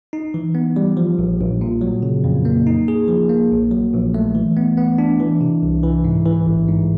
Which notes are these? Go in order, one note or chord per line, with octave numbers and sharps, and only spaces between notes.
D#4
E3
B3
G3
F3
A#1
A#1
A#2
F#3
C#3
F2
A#3
D#4
G#4
F3
A#3
A#1
F#3
A#1
A3
E3
B3
B3
D4
E3
C3
C2
E3
G#2
E3
A1
G#2